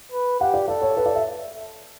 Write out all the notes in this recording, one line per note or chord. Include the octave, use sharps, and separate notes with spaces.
B4
G4 F#5
D5
A4 D5
C#5
B4
D5
E5